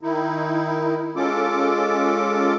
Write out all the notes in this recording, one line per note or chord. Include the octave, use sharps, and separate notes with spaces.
D#3 D#4 E4
G#3 C#4 F4 A4 D6